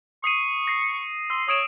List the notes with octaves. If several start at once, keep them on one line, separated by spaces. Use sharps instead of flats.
C#6 D#6 C7 D#7
A#6 C7
C6 E6
C#5 D#6 D7 E7